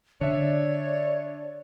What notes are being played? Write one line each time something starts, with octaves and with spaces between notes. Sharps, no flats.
D3 D4 C#5 D5 E5